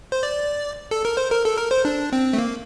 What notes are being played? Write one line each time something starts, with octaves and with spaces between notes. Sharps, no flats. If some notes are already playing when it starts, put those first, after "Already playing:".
C5
D5
A4
A#4
C5
A#4
A4
A#4
C5
D4
C4
A3
A#3